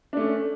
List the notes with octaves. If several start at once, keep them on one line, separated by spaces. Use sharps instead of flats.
A3 C#4 D4